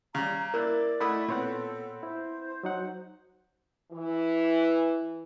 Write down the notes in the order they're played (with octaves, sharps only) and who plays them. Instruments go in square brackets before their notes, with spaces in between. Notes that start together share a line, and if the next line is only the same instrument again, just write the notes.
[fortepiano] C#3 G3 [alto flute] A#5
[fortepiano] A#3 E4 F#6 [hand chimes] A#4 [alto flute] D5
[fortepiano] A3 E4 D#6 [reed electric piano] D#5 F#5 [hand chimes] B5
[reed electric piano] A#2 C#5 F#5 [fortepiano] B3 C4 [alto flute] A4
[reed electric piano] E4 [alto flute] C5
[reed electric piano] F#3 D#4 F#5
[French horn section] E3